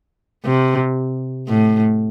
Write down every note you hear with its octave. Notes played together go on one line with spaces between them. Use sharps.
C3
A2